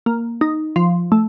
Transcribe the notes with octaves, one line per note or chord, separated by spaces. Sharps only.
A#3
D#4
F3
A3